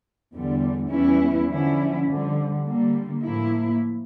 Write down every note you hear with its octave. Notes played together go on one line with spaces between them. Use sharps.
E2 D3 G3
E2 E3 G3 C#4 E4
D3 F3 C#4 E4
F2 D3 G3
D3 G3 A#3
A2 F3 A#3 E4